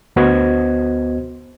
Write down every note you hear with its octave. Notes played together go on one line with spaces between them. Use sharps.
D2 B3 F#4 C5 D#5 G#6